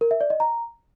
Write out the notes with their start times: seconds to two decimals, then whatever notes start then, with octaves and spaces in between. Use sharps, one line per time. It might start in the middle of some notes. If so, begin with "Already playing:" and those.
0.01 A#4
0.11 E5
0.21 D5
0.30 D#5
0.40 A#5